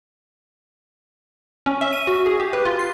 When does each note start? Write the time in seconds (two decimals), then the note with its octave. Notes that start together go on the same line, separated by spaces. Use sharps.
1.66 C#4
1.81 E5
1.93 D#7
2.07 F#4
2.26 G#4
2.40 G4
2.53 B4
2.65 F4
2.79 C7